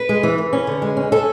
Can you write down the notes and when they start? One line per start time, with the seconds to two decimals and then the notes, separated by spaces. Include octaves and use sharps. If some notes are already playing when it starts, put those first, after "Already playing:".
Already playing: B4
0.09 G#3
0.23 E3
0.38 E3
0.53 C#4
0.67 D3
0.82 G#3
0.97 C#4
1.12 C#4 A4